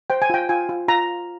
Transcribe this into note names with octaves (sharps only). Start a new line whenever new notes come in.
C5 G5
G#5
F4 G5
F4 G#5
F4
F4 A#5